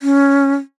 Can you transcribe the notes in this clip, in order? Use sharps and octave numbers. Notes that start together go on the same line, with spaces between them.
C#4